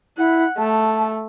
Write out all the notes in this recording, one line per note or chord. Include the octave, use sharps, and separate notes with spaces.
E4 F#5
A3 A5